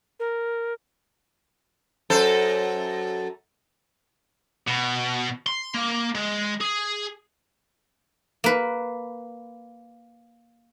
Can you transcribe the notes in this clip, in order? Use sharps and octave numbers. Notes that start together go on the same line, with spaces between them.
A#4
F#2 A4 C5
B2
C6
A#3
G#3
G#4
A#3 B4